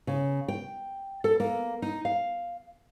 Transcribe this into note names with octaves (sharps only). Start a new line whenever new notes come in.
C#3
G5
A4
A#3
D#4
F5